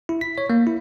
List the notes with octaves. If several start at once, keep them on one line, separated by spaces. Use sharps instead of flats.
E4
B6
C#5
A#3
E4